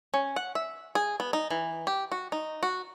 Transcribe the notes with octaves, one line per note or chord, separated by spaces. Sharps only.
C#4
F#5
E5
G#4
B3
D#4
E3
G4
F#4
D#4
F#4